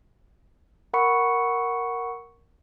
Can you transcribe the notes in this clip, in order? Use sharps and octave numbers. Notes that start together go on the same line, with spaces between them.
A#4 F#5 B5 C#6 C#7